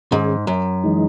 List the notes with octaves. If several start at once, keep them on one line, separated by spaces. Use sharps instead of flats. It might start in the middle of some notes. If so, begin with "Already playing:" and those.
G#2 D#3 G#3 C#4 G#4
F#2
E3 G#3 D#4